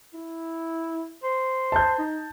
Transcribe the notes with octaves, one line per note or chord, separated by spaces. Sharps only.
E4
C5
A5 G6
D#4